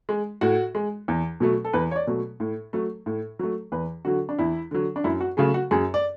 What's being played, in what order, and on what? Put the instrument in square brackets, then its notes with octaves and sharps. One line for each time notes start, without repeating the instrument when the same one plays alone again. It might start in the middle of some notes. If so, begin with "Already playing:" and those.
[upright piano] G#3
A2 F#4
G#3
E2
B2 F#3 A3
A4
E2 B4
C#5
D5
B2 F#3 A3
A2
F#3 A3
A2
F#3 A3
E2 B4
D3 F#3 F#4
D4
E2 E4
D3 F#3
D4
F#2 E4
F#4
C#3 F#3 A3 G#4
F#4
F#2 G#4
D5